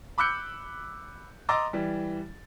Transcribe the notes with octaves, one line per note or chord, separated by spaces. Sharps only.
B5 D6 E6 F#6 G6 C#7
D#5 A#5 C6 D6 E6 A6
E3 G3